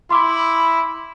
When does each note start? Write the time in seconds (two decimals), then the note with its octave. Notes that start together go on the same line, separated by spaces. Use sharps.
0.10 E4 B5 C6 D6